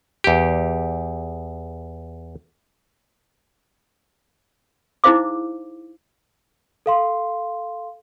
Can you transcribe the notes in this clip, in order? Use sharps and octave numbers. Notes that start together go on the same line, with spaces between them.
E2 G4
D#4 E4 G#4 C5 F5 D6
A4 F5 C6